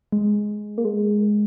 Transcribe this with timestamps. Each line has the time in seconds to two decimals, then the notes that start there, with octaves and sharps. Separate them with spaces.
0.12 G#3
0.78 A#3
0.85 G#3